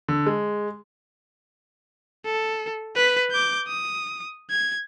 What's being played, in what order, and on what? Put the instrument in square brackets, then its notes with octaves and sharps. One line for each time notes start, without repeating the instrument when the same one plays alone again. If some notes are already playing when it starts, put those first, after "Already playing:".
[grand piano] D3
G#3
[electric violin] A4
B4 B6
D6 G6
D#6
G#6